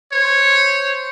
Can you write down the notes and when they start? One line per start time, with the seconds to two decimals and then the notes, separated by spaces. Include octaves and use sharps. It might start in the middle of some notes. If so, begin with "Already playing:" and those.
0.12 C5 C#5